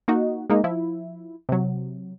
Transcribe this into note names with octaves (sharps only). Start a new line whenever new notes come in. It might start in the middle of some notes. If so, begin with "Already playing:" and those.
A#3 D#4 F#4
G#3 A#3 D#4
F3 E4
C3 F#3